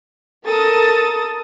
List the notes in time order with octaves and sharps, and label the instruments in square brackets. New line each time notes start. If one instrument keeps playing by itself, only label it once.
[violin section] A4 A#4 D#6 A6